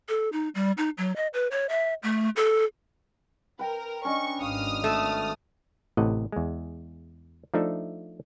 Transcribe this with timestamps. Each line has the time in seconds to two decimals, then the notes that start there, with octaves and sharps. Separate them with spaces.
0.09 A4
0.32 D#4
0.55 G3
0.78 D#4
0.98 F#3
1.16 D#5
1.34 B4
1.51 C#5
1.69 E5
2.03 A3
2.36 A4
3.59 A#4 B4 G5 A#5
4.05 C#4 D4 D#5 C#6
4.42 G#1 F5 D#6 F6
4.84 A3
5.97 A1 A2 C3 D#5 F#5
6.32 E2 G#3
7.54 F3 A3 D4 D#4 A4 E5